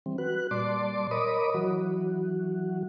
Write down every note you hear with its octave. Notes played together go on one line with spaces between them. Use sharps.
E3 G3 C4
F#4 B4 F#6
A#2 G3 D5 A5 C6 D6
A#4 C#5 D#5 B5 D6 D#6
E3 F#3 F#4